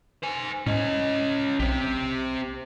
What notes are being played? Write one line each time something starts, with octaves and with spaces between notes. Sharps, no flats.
C5 G#5
A2 C#4 D#5
B1 C4 G4